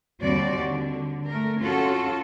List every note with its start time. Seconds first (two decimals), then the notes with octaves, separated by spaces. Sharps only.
0.23 D#2 D3 G3 C4 F#4 D5
0.61 D3
1.28 A3 A#4
1.61 C#4 F4 F#4 A4